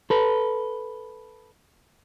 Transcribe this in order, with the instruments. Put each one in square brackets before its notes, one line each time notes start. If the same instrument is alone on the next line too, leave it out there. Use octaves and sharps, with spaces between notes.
[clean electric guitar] A4 B4